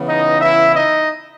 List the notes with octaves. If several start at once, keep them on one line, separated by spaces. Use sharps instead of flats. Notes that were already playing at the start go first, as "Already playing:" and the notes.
Already playing: C#3 E3 B3
D#4 D#5
E4 E5
D#4 D#5